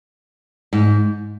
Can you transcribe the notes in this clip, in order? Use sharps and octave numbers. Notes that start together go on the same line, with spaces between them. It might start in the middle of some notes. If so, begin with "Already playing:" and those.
G#2